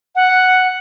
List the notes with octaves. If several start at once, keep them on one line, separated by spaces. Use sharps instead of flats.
F#5